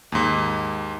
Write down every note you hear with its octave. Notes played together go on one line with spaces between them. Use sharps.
D#2 G#2